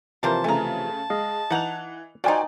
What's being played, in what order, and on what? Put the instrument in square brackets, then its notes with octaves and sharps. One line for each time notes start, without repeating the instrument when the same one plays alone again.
[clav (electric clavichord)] C3 E3 F3 [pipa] G3 A#3 C5 [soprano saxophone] A5
[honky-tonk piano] C#3 A3 [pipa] G#5 A#5
[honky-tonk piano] G#3 [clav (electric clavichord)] D#5 F5
[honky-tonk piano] E3 F7 [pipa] D#4 F#5
[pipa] F3 D#4 [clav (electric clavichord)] F#4 C5 [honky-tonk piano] D5 G5 G#5